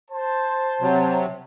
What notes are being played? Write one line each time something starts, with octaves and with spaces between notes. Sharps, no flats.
C5 A5
C3 F#3